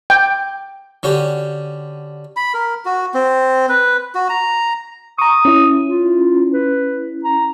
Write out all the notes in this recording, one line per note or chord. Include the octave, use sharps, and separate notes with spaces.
G5
D3 C#4 F#4 G4
B5
A#4
F#4
C4
B4
F#4
A#5
A#5 C#6 D#6
C#4 E4
F4
B4
A#5